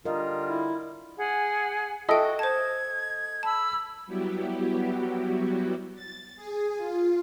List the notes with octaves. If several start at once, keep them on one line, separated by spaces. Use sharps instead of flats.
D3 G3 F4 A#4 D#5
E4
G#4 F#5 G#5
F#4 A4 D#5 E5 G5
C5 A5 G#6
A5 B5 E6
F#3 G3 B3 E4 F#4 G4
A6
G#4
F4